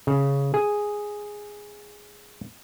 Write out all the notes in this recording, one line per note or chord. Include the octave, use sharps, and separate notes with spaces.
C#3
G#4